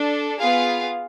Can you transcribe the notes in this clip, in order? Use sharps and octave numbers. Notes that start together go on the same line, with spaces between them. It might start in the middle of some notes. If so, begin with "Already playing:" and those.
Already playing: D4 A4
B3 F4 G#4 F5